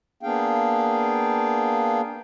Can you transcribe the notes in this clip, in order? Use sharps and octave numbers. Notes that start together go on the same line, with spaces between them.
A#3 B3 D4 G#4 F5 G5